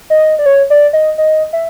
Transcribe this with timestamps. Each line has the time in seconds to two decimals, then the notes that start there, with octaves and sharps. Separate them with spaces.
0.10 D#5
0.39 D5
0.46 C#5
0.70 D5
0.93 D#5
1.18 D#5
1.53 E5